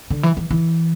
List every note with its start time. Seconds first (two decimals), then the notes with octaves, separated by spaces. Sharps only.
0.10 D3
0.23 E3
0.37 E3
0.51 E3